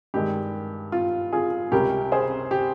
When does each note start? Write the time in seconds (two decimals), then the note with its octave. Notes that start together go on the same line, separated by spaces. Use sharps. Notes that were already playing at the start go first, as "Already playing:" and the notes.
0.14 G2 D#3 G#3 G4
0.92 F4
1.33 F4 G#4
1.72 C#2 C3 G3 C#4 G4 A#4
2.12 G#4 C5
2.51 G4